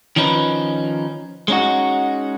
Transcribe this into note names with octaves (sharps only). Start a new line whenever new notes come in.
D#3 F3 C#4 D#4 B4
G#3 C#4 D#4 F#4